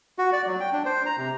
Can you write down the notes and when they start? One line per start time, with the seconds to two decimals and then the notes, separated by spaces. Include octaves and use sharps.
0.18 F#4
0.33 D5
0.47 F#3
0.60 G5
0.72 D4
0.86 C5
1.06 A#5
1.18 C3